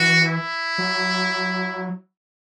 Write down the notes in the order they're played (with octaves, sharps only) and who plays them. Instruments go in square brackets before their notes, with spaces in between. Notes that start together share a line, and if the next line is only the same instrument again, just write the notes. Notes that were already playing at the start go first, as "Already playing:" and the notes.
Already playing: [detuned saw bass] E3 [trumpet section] F#4
[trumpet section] E4
[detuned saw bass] F#3